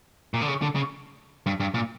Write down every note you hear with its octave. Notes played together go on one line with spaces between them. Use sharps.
A#2
D3
C#3
D3
C#3
G2
G2
A#2